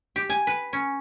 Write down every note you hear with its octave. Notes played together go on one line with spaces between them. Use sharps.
G4
G#5
B4
C#4